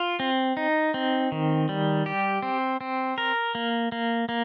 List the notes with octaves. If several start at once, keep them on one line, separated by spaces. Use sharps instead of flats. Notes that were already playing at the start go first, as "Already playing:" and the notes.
Already playing: F4
C4
D#4
C4
D#3
G3
G4
C4
C4
A#4
A#3
A#3
A#3